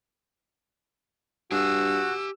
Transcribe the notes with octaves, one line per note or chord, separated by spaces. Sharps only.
G2 F#4 G4 G#5 E6